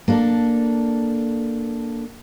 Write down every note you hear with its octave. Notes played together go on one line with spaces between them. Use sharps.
A#3 D4 A4